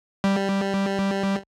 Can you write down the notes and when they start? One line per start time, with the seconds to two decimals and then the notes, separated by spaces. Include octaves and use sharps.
0.24 G3